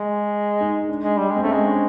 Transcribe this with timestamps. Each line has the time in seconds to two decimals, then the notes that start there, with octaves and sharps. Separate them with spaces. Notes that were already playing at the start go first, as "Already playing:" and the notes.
Already playing: G#3
0.61 D#4
0.89 D4
1.03 G#3
1.17 G3
1.30 G#3
1.36 C4
1.42 A3 C#4
1.52 G#3
1.64 D4